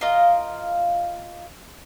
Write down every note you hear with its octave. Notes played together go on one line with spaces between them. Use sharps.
F4 A#4 D#5 F5